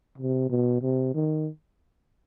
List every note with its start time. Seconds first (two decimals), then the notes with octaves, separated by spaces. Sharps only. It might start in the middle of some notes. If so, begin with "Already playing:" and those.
0.18 C3
0.50 B2
0.82 C3
1.14 D#3